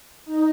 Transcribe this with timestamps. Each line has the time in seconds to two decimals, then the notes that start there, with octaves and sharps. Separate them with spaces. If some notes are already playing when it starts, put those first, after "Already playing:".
0.25 D#4